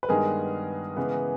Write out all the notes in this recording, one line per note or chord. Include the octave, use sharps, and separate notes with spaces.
B4
G2 D#3 G#3 B3 G#4 A#4
C#3 E3 G#3 B3